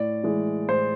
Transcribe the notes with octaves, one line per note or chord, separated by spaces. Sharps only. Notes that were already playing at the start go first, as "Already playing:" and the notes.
Already playing: A2 D5
E3 G#3
A2 C5